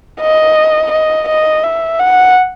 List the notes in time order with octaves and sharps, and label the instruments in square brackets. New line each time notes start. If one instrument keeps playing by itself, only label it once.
[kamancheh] D#5
D#5
D#5
E5
F#5